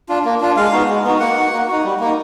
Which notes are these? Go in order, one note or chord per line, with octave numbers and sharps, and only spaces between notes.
D4 F4
A#3
D4 F4
G#3 F5
B3 D#4 F#4
G#3
B3 D#4 F#4
A#3 F#5
D#4 F#4
A#3
D#4 F#4
G3
A#3 D#4